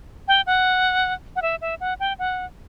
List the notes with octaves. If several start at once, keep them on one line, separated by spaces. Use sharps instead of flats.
G5
F#5
F#5
E5
E5
F#5
G5
F#5